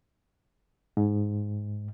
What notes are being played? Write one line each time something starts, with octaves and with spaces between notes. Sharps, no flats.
G#2